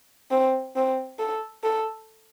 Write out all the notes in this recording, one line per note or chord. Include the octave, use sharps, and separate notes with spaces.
C4
C4
A4
A4